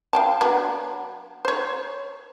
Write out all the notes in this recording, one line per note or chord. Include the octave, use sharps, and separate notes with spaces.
F5 G5 A5
F#3 B3 D4
C5 C#5